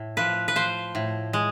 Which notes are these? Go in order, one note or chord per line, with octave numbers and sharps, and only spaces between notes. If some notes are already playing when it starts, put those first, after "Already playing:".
Already playing: A2
F3 B4
B4
F3 C5
A2
G#3